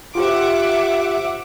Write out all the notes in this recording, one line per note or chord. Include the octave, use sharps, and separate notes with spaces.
F4 G4 C5 E5 F#5 D6